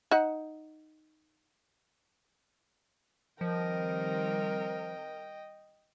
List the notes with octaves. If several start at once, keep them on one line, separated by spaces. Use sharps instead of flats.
D#4 F#5
D#3 F3 G3 C4 A#4 D#5 G5